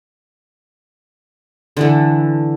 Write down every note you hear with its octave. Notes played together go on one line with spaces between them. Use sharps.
D3 E3 A3